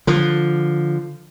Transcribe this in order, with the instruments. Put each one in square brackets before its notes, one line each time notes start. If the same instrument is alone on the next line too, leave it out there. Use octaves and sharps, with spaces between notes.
[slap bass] D3 F3